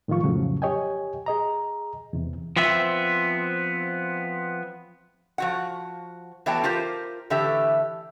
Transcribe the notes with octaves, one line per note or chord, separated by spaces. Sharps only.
A2 D#3 F3 F4 C#6
F2 A2 C#3 F3 F#3
G4 C#5 D#5 G5 G#5
G#4 D#5 A#5
E2 C3
F3 B3 C4 E5
F3 F#4 F#5
E3 F#3 A3 B3 G5 A5
F4 G4 A#4 C5
A2 D3 E3 A3 G4 E5